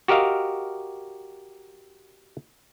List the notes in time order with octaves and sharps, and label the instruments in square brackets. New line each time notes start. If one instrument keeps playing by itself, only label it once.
[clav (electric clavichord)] F#4 G4 A#4 D#5 F5